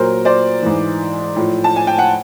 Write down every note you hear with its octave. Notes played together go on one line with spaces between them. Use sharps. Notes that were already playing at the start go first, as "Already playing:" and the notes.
Already playing: A#2 F#3 A#4 C5
C5 D5
G#2 E3
A2 F3
A5
G#5
G5
F#5